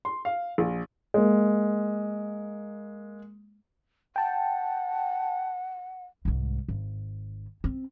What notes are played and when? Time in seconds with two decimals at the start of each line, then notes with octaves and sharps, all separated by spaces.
0.05 C6
0.25 F5
0.58 A#1
1.14 G#3 A#3
4.16 F#5 G5 A5
6.25 C2 G#2
6.68 G#1
7.64 C4